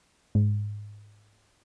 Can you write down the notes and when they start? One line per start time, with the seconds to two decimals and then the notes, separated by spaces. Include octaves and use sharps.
0.35 G#2